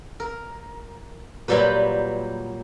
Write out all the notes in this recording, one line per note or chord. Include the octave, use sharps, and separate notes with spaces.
A#4
A#2 F#3 G3 G4 B4